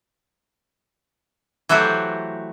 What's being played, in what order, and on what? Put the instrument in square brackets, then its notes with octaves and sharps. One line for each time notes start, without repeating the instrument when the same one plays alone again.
[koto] E3 F#3 A3 F#4 G4 C5